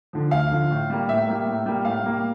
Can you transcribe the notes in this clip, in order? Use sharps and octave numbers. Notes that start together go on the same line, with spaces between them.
D3 F3
D2 F5
D3 F3
A2
G3 A#3
A2 E5
G3 A#3
A2
G3 A#3
A2 F5
G3 A#3